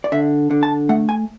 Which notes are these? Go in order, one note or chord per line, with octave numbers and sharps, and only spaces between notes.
D5
D3 E5
D3
A5
A3 F#5
G#5